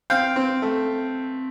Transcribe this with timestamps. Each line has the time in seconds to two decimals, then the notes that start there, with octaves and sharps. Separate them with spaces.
0.10 C4 F5 G5
0.36 C4
0.62 A3